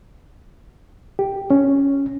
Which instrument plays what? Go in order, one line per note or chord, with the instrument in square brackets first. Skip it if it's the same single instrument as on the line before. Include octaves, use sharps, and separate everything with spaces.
[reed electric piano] G4
C#4